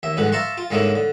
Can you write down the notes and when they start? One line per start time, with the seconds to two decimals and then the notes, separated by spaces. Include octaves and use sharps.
0.03 D#2 E5
0.17 A#1 G#2 D3 B4 F#5
0.32 E5 F5 A5 A#5 C6 C#6
0.57 F4
0.71 G#2 D3 A#3 C#4 D#4 E4
0.95 D3